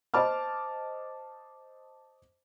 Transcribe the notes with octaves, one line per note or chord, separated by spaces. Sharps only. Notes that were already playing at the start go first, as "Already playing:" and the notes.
C5 D#5 A5 D6 F6